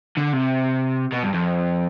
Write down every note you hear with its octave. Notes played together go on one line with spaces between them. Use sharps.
D3
C3
B2
G2
F2